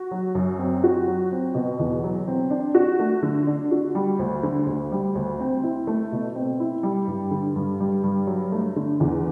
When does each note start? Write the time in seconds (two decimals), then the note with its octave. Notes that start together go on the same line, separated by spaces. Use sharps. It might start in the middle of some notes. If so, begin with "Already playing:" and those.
Already playing: F#4
0.11 F#3
0.35 F#2
0.59 C4
0.84 F#4
1.08 F#3
1.32 C4
1.54 B2
1.79 E2
2.03 F#3
2.27 C4
2.51 D4
2.75 F#4
2.99 A3
3.23 D3
3.47 D4
3.71 F#4
3.95 G3
4.19 D2
4.43 D3
4.67 D2
4.92 G3
5.15 D2
5.40 C4
5.63 E4
5.87 A3
6.12 B2
6.35 C4
6.60 E4
6.83 G3
7.07 G2
7.31 D3
7.55 G2
7.80 G3
8.03 G2
8.27 F#3
8.52 A3
8.76 D3
9.00 E2